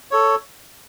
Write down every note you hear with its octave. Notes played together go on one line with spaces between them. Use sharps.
A4 C#5